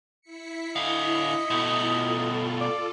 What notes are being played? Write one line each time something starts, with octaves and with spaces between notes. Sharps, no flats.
E4 B6 C#7
D3 D#5 F5
B2 A3
F4 A4
D5